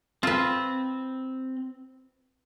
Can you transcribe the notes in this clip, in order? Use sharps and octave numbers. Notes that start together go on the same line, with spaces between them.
C4 F4 B4